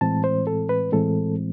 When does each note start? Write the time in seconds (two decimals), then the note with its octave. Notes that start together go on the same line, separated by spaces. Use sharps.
0.01 A2 E3 G#3 C4 A5
0.24 C5
0.47 A4
0.69 B4
0.92 A2 E3 G#3 C4 A4